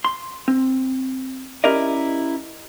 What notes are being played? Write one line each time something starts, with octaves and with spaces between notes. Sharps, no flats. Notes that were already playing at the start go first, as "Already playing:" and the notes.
C6
C4
C#4 E4 G4 A#4 D5 D#5